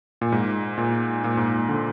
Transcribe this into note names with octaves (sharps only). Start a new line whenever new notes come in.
A#2
G#2
A#2
A#2
G#2
A#2
D3